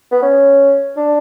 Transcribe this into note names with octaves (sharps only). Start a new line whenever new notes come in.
B3
C#4
D4